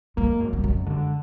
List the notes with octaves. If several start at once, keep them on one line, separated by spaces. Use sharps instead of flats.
G#3 A#3
F#2
G3
F#2 G#3
D3